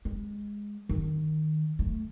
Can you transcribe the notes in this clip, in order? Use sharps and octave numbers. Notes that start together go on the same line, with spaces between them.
G#3
D#3
A3